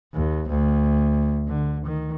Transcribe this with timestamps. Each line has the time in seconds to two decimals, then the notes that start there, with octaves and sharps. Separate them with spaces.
0.14 D#2
0.49 D2
1.48 D3
1.85 D#3